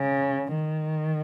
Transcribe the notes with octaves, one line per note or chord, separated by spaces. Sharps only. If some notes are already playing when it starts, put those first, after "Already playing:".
Already playing: C#3
D#3